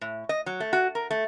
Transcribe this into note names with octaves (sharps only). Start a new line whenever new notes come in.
A2
D#5
F#3
A3
F#4
A#4
A3